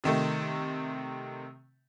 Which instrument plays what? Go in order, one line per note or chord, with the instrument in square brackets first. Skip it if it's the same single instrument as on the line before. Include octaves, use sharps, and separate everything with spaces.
[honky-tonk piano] C3 D#3 A3